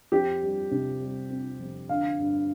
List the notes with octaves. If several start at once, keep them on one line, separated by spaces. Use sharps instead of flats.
F2 G4
G3
C3
G3
C4
F2
D3 F5
G2